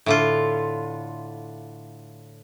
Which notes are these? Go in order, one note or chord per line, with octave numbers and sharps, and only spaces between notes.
A2 D3 F4